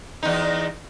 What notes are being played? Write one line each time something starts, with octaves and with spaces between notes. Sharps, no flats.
E2 D#4